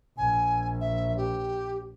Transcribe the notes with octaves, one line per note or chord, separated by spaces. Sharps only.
A#1 G#5
E5
G4